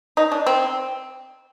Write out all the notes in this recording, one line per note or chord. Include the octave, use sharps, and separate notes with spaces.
D#4
D4
C4